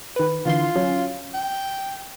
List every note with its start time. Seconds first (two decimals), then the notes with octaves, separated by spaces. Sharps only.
0.16 D#3 B4
0.46 D3 E3 F4 C6
0.76 F#3 C#4
1.34 G5